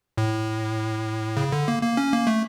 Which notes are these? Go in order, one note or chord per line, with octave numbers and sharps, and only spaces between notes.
A2
C#3
D3
A#3
A#3
C#4
A#3
A3